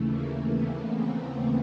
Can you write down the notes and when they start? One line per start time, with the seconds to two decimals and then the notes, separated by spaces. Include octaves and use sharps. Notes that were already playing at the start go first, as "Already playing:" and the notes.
Already playing: D#2 C#3 E3 A3
0.10 A#3
0.52 B3
0.95 C4